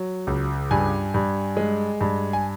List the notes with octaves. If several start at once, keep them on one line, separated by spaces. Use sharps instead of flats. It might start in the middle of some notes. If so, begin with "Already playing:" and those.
Already playing: F#3
C#2
G2 G#5
G2
G#3
G2
G#5